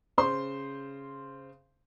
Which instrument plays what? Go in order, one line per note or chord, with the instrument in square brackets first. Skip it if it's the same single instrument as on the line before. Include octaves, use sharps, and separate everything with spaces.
[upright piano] C#3 C5 C6